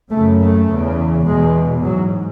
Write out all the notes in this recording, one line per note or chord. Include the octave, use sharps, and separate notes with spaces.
F#2 C#3 A3
A3
E2 C#3
E2 B2 G#3
G#2 F#3